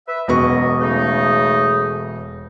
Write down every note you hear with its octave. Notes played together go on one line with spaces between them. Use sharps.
B4 E5
E1 F#2 B3 D#5 C#6
C#3 A3 D#4